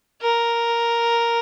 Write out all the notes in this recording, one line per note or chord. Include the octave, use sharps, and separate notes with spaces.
A#4